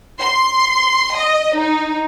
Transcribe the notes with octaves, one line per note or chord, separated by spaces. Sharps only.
C6
D#5
D#4